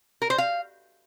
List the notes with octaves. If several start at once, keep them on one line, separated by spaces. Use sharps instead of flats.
A#4
C5
F5